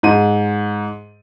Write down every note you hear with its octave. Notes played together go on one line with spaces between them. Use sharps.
G#2 D#7